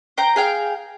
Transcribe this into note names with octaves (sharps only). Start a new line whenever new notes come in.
C5 G5 A#5
G#4 F5 G5